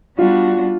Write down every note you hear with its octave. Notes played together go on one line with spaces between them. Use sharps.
G3 B3 D4 F4 F#4